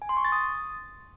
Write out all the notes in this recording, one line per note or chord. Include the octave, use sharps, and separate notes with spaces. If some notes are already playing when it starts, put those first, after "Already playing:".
G#5
C6
C#6
A6
D#6